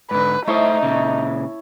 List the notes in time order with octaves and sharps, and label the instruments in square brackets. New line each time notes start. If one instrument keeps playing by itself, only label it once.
[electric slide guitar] G#2 D3 [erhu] B4
[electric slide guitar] A3 C5 D#5 [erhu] D#4 [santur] E4 C#5 A5
[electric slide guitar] A#2 C#3